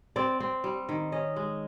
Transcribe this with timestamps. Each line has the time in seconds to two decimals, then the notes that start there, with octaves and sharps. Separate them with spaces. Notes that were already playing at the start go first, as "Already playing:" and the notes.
0.16 C4 D5
0.40 C4
0.64 G3
0.89 D#3
1.12 C#4 D#5
1.36 G#3